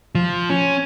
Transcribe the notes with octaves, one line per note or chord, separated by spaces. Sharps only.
F3
C#4